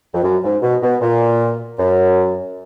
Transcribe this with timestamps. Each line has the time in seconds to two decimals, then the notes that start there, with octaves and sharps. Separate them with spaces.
0.13 F2
0.23 F#2
0.43 G#2
0.62 B2
0.82 B2
1.01 A#2
1.78 F#2